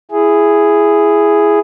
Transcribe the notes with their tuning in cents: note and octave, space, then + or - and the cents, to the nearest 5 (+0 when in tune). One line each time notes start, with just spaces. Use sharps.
E4 +15 G#4 +0